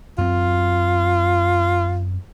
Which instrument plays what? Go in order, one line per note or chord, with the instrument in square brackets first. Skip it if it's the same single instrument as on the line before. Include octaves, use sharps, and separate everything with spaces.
[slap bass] F#2 C4 [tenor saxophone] F4